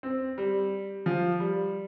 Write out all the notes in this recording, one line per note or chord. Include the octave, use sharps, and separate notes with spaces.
C4
G3
F3
G3